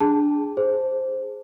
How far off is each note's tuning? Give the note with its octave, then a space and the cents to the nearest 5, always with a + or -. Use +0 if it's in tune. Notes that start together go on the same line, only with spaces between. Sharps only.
D4 +0 G#4 +0 A5 +10
G#4 +0 C5 +0